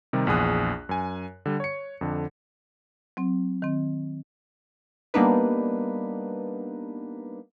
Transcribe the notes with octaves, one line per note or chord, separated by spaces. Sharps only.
C3 D#3 G3
A#1 E2 G#4 D#6 F#6
F#2 G#5
D3 G3
C#5 C#7
F2 D3
F#3 C4
D#3 C4
G3 A#3 B3 D4 D#4 B4